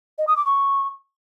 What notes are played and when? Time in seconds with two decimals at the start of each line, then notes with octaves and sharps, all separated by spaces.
0.18 D#5
0.27 D#6
0.36 D6
0.46 C#6